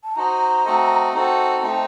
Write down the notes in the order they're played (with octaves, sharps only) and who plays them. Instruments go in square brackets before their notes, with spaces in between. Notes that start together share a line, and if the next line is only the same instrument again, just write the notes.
[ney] A5
[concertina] D#4 F#4 C5 D#5 [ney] A#5
[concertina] A3 C4 F#4 A4 D#5
C4 D#4 F#4 A4
[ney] G5
[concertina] A3 C4 D#4 [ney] A5